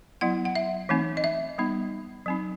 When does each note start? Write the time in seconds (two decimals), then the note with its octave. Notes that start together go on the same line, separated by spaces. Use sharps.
0.21 F#3 B3 E4 F#5
0.45 F#5
0.55 E5
0.89 E3 A3 C4 D#4
1.17 D#5
1.24 E5
1.58 G3 B3 D#4
2.26 F#3 C4 D#4